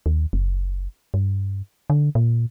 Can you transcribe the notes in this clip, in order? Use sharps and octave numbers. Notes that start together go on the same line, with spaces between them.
D#2
F#1
G2
D3
A#2